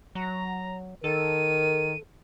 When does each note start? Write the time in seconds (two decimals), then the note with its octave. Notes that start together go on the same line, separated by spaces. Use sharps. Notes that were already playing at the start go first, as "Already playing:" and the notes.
0.15 F#3 A#5
1.04 D#3 A4 A#4 D#7